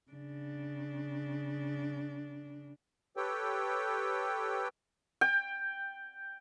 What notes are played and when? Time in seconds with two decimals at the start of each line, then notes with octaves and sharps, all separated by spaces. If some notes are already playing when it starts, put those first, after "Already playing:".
0.12 C#3 D4
3.17 G4 A4 B4 C#5 G5
5.21 G5